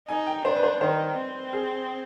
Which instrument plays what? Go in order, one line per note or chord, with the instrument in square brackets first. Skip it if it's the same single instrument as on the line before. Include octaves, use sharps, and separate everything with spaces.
[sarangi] D#4 [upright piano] G#5
[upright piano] G5
[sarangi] D4 [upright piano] C5
[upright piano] B4
C5
[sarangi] D#3 [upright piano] C5
[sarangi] C4
[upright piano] G#4